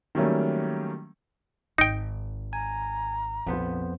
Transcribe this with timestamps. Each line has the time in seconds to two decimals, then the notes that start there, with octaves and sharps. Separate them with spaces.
0.15 D#3 F#3 G3 A3 A#3 C#4
1.78 G#1 D#4 G5
2.53 G#5 A#5
3.47 A#1 F2 B3 C5